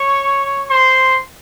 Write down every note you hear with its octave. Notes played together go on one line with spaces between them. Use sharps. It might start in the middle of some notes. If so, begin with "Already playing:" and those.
Already playing: C#5 C#6
C5 C6